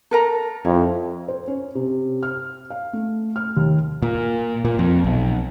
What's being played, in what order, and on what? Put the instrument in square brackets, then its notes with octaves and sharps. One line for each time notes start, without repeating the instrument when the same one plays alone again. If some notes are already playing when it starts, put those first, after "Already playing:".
[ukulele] A4 A#4 A#5
[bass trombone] F2 [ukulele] E4
[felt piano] C5
C#4
C3
F6
F5
A3
F6
D#2
[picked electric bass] A#2
A#2
F2
B1